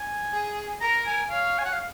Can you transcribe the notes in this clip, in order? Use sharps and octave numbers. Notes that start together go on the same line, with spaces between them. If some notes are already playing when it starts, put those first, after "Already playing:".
Already playing: G#5
G#4
A#4 A#5
G#5
C#5 F5
G#5
F#5
F5